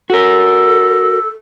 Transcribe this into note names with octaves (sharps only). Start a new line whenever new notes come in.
F#4 A4 A#4